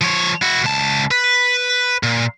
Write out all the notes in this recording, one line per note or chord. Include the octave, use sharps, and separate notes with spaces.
F3 C#5
E4 F#4
C#2 A5
B4
A#2